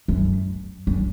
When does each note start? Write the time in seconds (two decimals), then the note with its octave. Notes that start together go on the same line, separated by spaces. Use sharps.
0.08 F#2
0.87 F#2